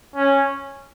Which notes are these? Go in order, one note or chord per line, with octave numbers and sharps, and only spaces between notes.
C#4